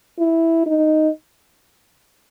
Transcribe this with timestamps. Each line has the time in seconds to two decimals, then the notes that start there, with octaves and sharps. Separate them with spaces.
0.19 E4
0.66 D#4